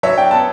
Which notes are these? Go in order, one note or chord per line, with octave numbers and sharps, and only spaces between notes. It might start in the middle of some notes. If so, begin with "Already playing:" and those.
F#3 C#5 E5
D4 G5
B3 A5